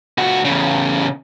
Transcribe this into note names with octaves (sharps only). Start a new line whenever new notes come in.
C#2 F#4
E2 C#3